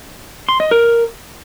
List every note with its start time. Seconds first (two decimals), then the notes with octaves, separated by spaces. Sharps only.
0.49 C6
0.60 D#5
0.71 A#4